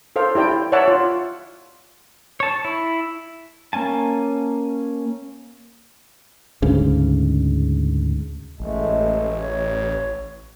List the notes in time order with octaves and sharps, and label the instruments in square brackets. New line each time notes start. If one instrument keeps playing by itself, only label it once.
[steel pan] A4 C5 F5
E4 G4 D5 G5
C#5 D5 E5 F#5 A5
F4
[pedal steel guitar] C#5 A5
E4
A#3 C#4 G#5 A5
[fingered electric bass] D2 G#2 C#3
[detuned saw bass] A1 [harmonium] G#3 A3
[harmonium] C#5